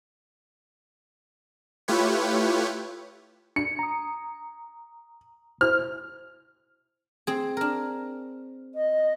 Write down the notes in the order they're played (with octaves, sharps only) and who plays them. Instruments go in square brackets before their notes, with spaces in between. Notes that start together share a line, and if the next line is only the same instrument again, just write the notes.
[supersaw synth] A3 E4 F4 G4 B4 C#5
[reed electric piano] D4 [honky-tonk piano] C#7
[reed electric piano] A#5 D#6
[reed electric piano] E4 C5 [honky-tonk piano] F6
[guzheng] C4 G#4
D4 A#4
[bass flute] D#5